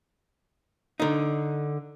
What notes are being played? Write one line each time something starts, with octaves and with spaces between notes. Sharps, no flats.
D3 D#4